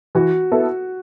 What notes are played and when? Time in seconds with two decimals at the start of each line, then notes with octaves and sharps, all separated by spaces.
0.15 E3 F#4
0.52 B3 E4 A4